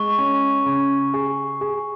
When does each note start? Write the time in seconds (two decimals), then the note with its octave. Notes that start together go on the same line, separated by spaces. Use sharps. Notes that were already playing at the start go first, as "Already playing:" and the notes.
Already playing: G#3 C#6
0.18 C#4
0.66 C#3
1.14 G#4
1.61 G#4